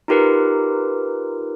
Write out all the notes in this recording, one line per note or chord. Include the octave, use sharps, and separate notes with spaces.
D#4 F4 G4 A#4 B4